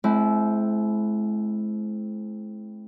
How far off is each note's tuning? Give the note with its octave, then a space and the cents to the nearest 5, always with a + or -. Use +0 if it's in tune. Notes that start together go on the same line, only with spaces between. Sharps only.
G#3 +45 C4 +0 E4 +0